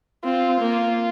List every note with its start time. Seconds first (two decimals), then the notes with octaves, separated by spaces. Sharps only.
0.25 C4 F4
0.61 A#3